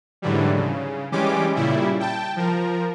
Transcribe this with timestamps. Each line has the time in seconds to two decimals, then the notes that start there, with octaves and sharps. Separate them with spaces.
0.22 G#2 D3 E3 F#3 G3
0.56 C#3
1.12 E3 G3 G#3 C#4 G4 D6
1.56 A#2 C#3 G3 E4
2.00 G5 A5
2.36 F3 A#4